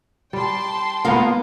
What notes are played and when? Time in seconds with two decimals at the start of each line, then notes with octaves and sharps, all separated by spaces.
0.33 G3 G5 A5 C6
1.05 A#3 B3 F4 A#4 D#5 F5